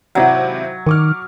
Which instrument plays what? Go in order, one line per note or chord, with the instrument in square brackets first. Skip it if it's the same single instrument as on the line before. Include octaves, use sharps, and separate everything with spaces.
[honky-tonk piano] G#1 C3 E4 [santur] F#3
[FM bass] D#3 [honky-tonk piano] C#6 D6 F6